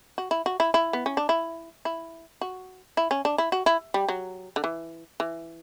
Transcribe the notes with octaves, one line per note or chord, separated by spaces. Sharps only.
F#4
E4
F#4
E4
E4
B3
C#4
D4
E4
E4
F#4
E4
C#4
D4
E4
F#4
E4
G3
F#3
D3
E3
E3